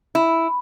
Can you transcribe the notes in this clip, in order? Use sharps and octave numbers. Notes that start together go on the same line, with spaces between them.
E4